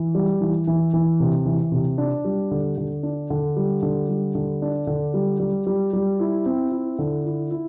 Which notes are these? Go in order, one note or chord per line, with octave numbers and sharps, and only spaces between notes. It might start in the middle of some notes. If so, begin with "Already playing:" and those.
Already playing: E3
G3
E3
E3
E3
C3
E3
C3
D4
G3
D3
D3
D4
D3
G3
D3
G3
D3
D4
D3
G3
G3
G3
G3
E4
C4
E4
D3
E4
E4